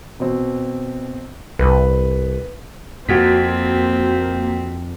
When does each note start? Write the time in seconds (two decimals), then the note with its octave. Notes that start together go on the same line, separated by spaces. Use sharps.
0.20 B2 C4
1.59 C2 B4
3.09 F2 A#3 C4 F#4 B6